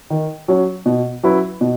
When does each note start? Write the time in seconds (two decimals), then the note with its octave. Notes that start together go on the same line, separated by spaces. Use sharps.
0.10 D#3
0.48 F#3 C#4
0.86 B2
1.23 F#3 C#4 E4 B4
1.61 B2